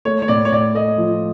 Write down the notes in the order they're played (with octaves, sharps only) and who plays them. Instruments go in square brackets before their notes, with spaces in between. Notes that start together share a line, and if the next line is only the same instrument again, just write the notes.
[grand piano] A3 [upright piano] C#5
[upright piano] C#5
[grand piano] A2 [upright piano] D5
[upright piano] C#5
[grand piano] A2 [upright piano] D5
[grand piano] A3 [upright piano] D#5
[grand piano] F3